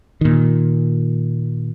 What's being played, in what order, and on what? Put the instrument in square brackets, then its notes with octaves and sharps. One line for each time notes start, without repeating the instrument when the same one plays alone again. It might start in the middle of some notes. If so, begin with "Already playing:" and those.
[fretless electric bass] A#2 D#3